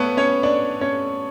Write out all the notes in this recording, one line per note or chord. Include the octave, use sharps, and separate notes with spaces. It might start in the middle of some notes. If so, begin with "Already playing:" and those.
Already playing: A3 B3 A4 B4 C#5
C#4 C#5
D4 D5
C#4 C#5